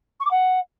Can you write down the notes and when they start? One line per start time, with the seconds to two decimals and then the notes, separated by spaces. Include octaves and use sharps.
0.20 C#6
0.25 D6
0.30 F#5